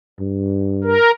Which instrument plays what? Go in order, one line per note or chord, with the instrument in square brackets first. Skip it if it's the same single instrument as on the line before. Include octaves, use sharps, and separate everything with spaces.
[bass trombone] G2
[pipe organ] A#4